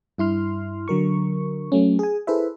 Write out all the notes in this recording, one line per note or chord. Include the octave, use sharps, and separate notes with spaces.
G2 E4 C6 F6
D3 F#3 A#4 C#6
F#3 A3 C#4
G#4 G#5
E4 G#4 A4 B4 C5 E5